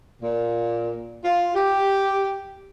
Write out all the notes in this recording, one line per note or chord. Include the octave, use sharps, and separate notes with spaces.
A#2
F4
G4